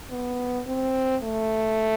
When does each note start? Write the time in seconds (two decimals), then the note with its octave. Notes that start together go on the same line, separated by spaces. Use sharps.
0.11 B3
0.67 C4
1.23 A3